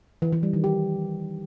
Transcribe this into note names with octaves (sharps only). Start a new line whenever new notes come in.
E3
E3
G3
D#3
G4